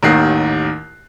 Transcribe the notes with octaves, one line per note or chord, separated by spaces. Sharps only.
A1 D#2 D#3 F#6 C7